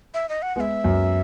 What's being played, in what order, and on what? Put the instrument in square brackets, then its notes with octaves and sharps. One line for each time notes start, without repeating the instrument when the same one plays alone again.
[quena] E5
D#5
F#5
[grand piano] G#3 B3 [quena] F#5
[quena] E5
[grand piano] F#2